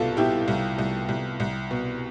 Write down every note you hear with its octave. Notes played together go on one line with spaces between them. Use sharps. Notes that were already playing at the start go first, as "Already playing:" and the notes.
Already playing: C2 B2 F4 A4
B2 E4 G4
C2
C2
C2
C2
B2